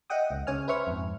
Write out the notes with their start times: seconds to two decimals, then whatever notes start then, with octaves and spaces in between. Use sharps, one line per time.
0.10 D#5 E5 F#5 G5 D#6
0.30 C#2
0.47 C#3 C#5 G#5 F6
0.68 B4 C5 E5 C#6 F6
0.87 F2 G#2